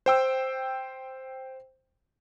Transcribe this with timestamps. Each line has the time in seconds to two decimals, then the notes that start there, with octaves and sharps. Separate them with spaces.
0.06 C5 G5 E6